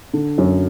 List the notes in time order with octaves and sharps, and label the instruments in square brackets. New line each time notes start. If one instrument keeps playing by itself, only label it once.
[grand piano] D3
F#2 F#3